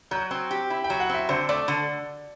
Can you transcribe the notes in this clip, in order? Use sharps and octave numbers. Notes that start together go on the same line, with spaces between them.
F#3 G6
C4
G4
E4
G5
F#3
F#5
C4 E5
D3 C5
A3 D5
D3